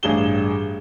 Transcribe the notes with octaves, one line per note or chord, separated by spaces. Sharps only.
A1 G2 G#4 E7 G7